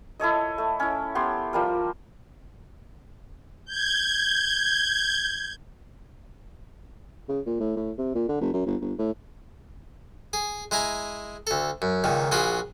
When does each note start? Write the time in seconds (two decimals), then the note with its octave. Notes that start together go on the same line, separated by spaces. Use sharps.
0.20 E4 A4 C#5 D#5
0.58 A3
0.80 C#4 E4
1.15 B3 G4 C#5 C6
1.53 F3 G3 A#4
3.65 G6 G#6
7.29 C#3
7.46 A#2
7.60 A2
7.77 A2
7.98 C3
8.15 A#2
8.28 D3
8.41 F#1
8.54 F#2
8.66 G1
8.81 G1
8.98 A2
10.33 G#4
10.71 G#3 E4 G#5 A#5
11.47 D2 A4
11.82 F#2
12.04 C#2 A#2 D#3
12.31 A#1 F4 F#4 G#4 B5